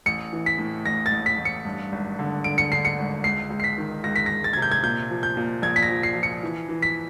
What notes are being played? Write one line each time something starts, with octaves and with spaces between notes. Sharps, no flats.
A1 C#7
E3
B6
A2
A1 A#6
A6
A1
B6
A1
C#7
G2
G#1
D3
D3 D7
C#7
D3 C7
C#7
G#1
C#2 C7
C#2
C7
B6
D#3
C#2 A#6
B6
A#6
C#2
A6
C3 G#6
G6
G#6
A#2 G6
F3
G6
A#2
A#1 G#6
B6
A#6
F3
C7
F3
C#7
E3
E3
B6